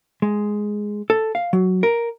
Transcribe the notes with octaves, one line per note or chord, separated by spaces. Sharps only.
G#3
A4
F5
F#3
A#4